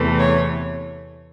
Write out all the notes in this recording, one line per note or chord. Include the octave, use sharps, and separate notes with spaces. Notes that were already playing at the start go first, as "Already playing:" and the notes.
Already playing: E2 C3 E3 A3
C#5